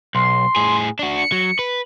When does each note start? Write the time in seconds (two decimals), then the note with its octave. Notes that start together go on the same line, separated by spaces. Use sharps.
0.15 B1 C6
0.56 A2 G#4
0.99 D4 F#4
1.17 C#7
1.32 F#3
1.59 B4